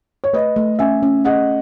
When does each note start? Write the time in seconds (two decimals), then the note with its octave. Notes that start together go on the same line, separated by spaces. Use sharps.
0.24 C#5
0.33 A3 B4 D#5
0.56 A3
0.79 C#4 E5 G#5
1.03 C#4
1.25 G#4 D#5 F#5